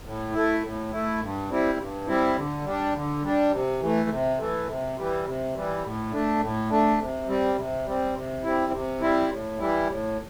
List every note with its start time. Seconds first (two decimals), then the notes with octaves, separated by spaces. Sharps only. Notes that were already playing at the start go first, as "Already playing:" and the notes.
0.05 A2
0.33 A3 E4
0.63 A2
0.92 A3 E4
1.21 G2
1.50 G3 C4 E4
1.79 G2
2.07 G3 C4 E4
2.36 D3
2.65 G3 D4
2.94 D3
3.23 G3 D4
3.52 C3
3.81 E3 A3
4.10 C3
4.39 E3 A3
4.67 C3
4.97 E3 G3
5.26 C3
5.55 E3 G3
5.84 A2
6.12 A3 D4
6.41 A2
6.70 A3 D4
6.99 C3
7.28 G3 C4
7.57 C3
7.85 G3 C4
8.15 C3
8.44 G3 C4 E4
8.73 C3
9.01 G3 C4 E4
9.30 A2
9.59 E3 G3 E4
9.89 A2